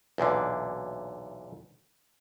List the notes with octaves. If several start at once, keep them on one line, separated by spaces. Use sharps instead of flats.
B1 E2 A#2 D3